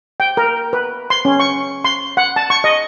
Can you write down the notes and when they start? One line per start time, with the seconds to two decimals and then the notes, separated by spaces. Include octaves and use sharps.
0.20 G5
0.37 A#4
0.73 B4
1.10 C6
1.25 C#4
1.40 C#6
1.85 C6
2.17 F#5
2.36 A5
2.50 C#6
2.64 D#5